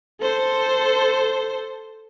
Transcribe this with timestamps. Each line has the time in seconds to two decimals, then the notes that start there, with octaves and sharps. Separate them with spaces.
0.21 A4 C5